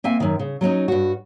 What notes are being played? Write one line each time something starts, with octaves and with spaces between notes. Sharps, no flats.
A#3 C4 E5 G#5
F#2 D#3
C#3
F#3 B3 C#4 D#4
G2 F#4